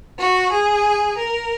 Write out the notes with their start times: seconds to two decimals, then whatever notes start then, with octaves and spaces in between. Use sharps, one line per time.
0.18 F#4
0.52 G#4
1.17 A#4